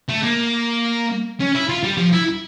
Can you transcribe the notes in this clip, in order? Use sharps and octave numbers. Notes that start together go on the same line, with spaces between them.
A3
A#3
C#4
E4
F4
G3
F3
E4